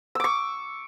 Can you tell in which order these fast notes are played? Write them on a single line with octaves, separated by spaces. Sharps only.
E6 D6 C#6